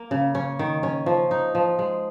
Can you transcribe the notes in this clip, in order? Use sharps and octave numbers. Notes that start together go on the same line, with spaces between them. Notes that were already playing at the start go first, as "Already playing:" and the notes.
Already playing: A#3
C#3
C#4
D#3
C#4
F3
D#4
F3
G#3